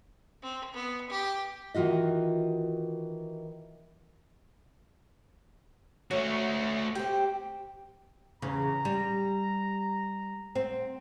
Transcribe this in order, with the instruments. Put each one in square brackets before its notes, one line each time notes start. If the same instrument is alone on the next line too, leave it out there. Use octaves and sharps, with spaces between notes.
[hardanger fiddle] C4
B3
G4
[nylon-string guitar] D#3 E3 F4 F#4 D#5
[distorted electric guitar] A3 F#4 [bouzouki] C#4
[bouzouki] C4 G4
[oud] E2 C#3 [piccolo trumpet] A#5
[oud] G3
C4